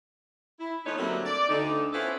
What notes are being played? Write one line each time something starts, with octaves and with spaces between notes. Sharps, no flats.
E4
E3 F3 A3 B3 D#4 C#5
D3 F#3 G3 A3 A#3 C4
D5
D2 D3 D#4
B3 C#4 E4 F4 A4 C5